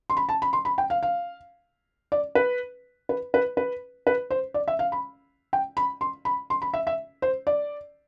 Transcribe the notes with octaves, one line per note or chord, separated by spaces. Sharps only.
C6
B5
A5
B5
C6
B5
G5
F5
F5
D5
B4
B4
B4
B4
B4
C5
D5
E5
F5
B5
G5
B5
C6
B5
C6
B5
E5
E5
C5
D5